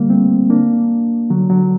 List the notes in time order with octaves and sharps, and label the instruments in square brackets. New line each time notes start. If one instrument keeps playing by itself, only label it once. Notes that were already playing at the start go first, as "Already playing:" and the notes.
Already playing: [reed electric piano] D3 G3 A#3
A3 C4
A#3 D4
D3 F#3
D3 F#3